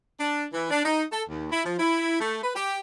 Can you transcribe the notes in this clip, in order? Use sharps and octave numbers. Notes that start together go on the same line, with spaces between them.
D4
E3
D4
D#4
A4
D#2
E4
F3
E4
A3
B4
G4